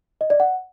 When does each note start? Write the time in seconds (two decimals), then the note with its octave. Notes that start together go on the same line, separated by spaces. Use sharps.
0.21 D#5
0.30 D5
0.40 F#5